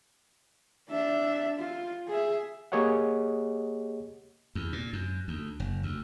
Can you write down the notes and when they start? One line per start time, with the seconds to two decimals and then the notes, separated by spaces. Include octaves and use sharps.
0.89 D4 E5
1.58 F4
2.08 G#4 E5
2.72 A#3 G4 G#4 C#5 D#5 F#5
4.55 E2
4.73 A#2
4.93 F#2
5.28 D2
5.60 F#1
5.83 D2